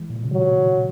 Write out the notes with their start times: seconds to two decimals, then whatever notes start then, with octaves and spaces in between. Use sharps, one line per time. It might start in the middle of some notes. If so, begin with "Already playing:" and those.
Already playing: E3 G#3
0.10 A#2
0.16 B2
0.23 C#3
0.32 D#3 F#3
0.57 E3